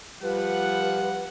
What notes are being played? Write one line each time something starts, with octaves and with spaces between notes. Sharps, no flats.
F3 G3 B4 F#5